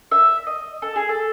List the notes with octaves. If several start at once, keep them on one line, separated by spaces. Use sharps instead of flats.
E5
D#5
A4
G#4
A4